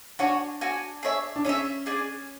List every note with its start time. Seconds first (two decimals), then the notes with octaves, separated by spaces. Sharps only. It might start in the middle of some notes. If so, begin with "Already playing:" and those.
0.19 D4 F#4 C#5 G#5
0.61 F#4 C#5 G#5
1.03 G#4 C#5 E5
1.36 D4
1.45 C#4 G#4 C#5 E5
1.86 D4 G#4 D5 G#5